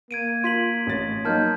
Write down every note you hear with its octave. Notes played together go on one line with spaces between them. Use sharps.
A#3 G#6 D7 D#7
F4 C6 B6 F#7
A1 A6
F#3 A#3 D#4 A5 F6 G6